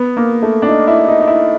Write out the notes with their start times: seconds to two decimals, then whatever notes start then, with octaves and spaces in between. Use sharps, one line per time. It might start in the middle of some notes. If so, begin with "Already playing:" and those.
Already playing: B3
0.17 A#3
0.42 A3
0.62 D4
0.68 D#4
0.87 E4
1.08 D#4
1.20 D#4
1.27 E4